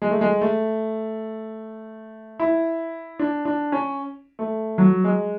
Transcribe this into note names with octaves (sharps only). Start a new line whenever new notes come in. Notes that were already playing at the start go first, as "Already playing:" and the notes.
G#3
A3
G#3
A3
E4
D4
D4
C#4
A3
F#3
G#3